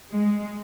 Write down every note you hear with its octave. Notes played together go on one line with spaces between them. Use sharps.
G#3